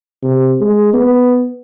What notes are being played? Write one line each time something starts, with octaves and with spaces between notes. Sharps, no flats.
C3
G#3
B3